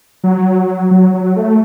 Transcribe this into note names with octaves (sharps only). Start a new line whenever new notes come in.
F#3
F#3
F#3
A3